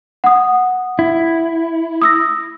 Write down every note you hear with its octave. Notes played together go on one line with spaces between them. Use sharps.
F#5 D#6
E4
D#6 E6 A#6